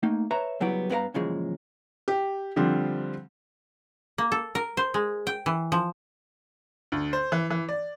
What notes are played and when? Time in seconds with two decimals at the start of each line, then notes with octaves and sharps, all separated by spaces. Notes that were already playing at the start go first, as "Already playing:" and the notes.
0.03 A3 A#3 D#4
0.31 B4 C#5 E5 A5 A#5
0.60 C#3 F#3 G3 B3 E4 D5
0.89 G2 B3 D#4 A#4 F5 A#5
1.14 F#2 A#2 C#3 E3 F3 G#3
2.08 G4
2.56 D3 F3 G3 C4
4.18 A#3
4.32 A4
4.55 A#4
4.77 C5
4.94 G#3
5.27 G5
5.46 E3
5.72 F3
6.92 D2
7.13 C5
7.32 E3
7.50 E3
7.69 D5